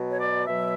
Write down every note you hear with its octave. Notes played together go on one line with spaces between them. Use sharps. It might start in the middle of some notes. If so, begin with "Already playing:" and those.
Already playing: B2 F#3
C#5
D5
B2 F#3 E5